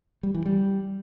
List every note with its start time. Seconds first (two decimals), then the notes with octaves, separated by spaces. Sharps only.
0.23 G3
0.34 E3
0.46 G3